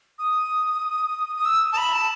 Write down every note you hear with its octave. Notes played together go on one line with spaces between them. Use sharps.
D#6
D#6
E6
A5
B5
A5